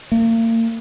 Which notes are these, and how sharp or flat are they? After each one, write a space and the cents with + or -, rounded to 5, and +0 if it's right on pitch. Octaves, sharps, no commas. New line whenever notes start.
A#3 -40